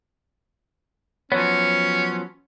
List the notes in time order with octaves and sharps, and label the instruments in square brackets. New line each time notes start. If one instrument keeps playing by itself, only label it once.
[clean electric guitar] F3 F#3 B3 [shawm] C#4 [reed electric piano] C#5